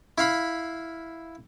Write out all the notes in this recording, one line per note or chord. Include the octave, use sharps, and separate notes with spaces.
E4 F5 B5